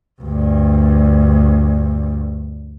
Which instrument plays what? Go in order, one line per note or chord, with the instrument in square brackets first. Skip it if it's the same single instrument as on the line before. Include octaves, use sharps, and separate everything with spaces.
[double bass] D2 G2